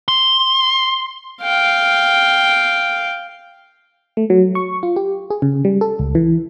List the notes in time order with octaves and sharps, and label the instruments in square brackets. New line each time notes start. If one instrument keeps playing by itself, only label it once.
[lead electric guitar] C6
[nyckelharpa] F5 G5
[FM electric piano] A3
F#3
C#6
F4
G4
G#4
C#3
G3
A4
C#2
E3